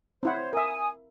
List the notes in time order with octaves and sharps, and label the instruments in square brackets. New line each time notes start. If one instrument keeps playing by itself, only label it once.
[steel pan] C4 E4 F#5 [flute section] C5 C#5
[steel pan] A#4 E5 [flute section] G#5 D#6